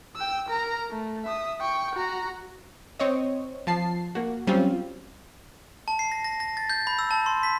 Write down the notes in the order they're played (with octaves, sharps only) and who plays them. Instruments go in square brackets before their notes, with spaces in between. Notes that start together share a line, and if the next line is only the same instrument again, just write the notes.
[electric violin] G5 E6
A#4 A#5
A3
E5 D#6
G5 C#6
F#4 A#5
[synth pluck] C4 C#5 D#5
F3 A5 C7
A#3 F#4
F#3 G3 C4 C#4 F4
[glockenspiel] A5
C7
A#6
A#6
A#6
A6
G6
B5
E6
A5
C6
B6